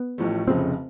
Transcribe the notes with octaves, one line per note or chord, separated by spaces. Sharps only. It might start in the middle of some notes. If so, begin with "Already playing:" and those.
Already playing: B3
A1 A2 F3 A3
F1 F2 C#3 F3 C4